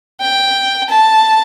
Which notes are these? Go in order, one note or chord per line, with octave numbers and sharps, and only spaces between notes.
G5
A5